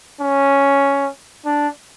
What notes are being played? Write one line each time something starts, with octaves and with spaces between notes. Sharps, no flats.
C#4
D4